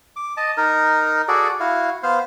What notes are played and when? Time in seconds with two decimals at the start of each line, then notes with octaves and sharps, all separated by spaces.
0.16 D6
0.37 D#5 A5
0.57 D#4 A#4
1.28 F#4 G#4 A4 D5
1.60 E4 F#4 F5
2.03 B3 C5 F5